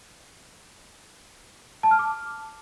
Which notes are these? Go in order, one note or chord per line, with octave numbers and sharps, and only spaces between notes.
A5
F6
D6